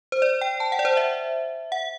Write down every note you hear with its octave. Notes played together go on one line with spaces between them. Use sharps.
C5
D5
G5
A5
F#5
D5
C5
E5
F#5